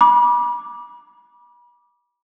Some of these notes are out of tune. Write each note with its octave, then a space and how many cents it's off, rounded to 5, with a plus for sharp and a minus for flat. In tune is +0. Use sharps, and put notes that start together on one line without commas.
B5 -35 D6 +0